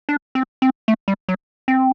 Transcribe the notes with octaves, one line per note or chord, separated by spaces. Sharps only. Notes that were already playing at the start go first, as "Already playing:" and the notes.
D4
C4
C4
A3
G3
F#3
C4